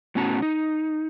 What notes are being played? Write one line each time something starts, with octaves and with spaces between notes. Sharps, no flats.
A2 B3 C#4 F#4 A5 A#5
D#4